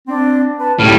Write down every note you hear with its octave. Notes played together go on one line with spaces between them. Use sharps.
C4 D4
B4 A5
C#2 F#2 A2 G3 F6